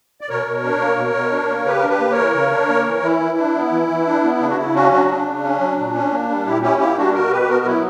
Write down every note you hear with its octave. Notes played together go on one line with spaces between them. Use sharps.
D5
B2 A#4 C#5
B2
D4
A#3
B2
B2
D4
A#3
C#3 G4 B4
D4 A#4
G4 B4
A#3
A#4 C#5
E3
C#3
D4
A#3
E3
E3 E4
E3
D4
B3
E3
E3
D4
B3
C#3 D4
F#4
C#3 E4
C#4 D4 F#4
F#3 D4 F#4
C#3 D4
C#3
C#4
F#3
A#2
C#4
A#3
G3
A#2 E4 G4
C#4 E4 G4
A#3 E4 G4
G3 D4 F#4
B2 F#4 A#4
B2 G4 B4
G4
B3 F#4 A#4
F#3 E4